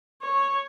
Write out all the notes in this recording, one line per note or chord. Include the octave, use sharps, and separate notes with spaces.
C#5